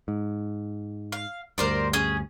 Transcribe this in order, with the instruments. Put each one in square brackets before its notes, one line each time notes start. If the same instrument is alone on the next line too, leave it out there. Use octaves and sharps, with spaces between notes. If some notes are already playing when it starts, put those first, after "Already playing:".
[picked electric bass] G#2
[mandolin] F5
[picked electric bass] D2 G2 [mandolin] A#4 C5 D5
[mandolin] C#4 G#4